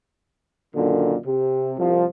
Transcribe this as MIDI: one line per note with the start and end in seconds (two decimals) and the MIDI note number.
0.75 1.15 42
0.75 1.15 46
0.75 1.15 50
0.75 1.15 51
1.25 1.73 48
1.77 2.04 36
1.77 2.04 53